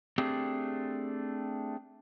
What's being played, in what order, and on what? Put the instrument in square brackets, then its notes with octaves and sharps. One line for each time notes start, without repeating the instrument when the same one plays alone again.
[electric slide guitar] A3 C4 D4 G4 G#4